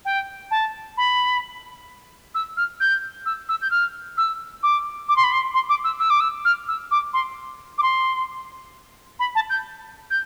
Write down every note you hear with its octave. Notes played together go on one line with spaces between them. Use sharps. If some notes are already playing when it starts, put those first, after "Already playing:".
G5
A5
B5
E6
F6
G6
E6
E6
G6
F6
E6
D6
D6
C6
B5
C6
C6
D6
E6
E6
D6
E6
F6
E6
D6
C6
D6
C6
B5
A5
G6
G6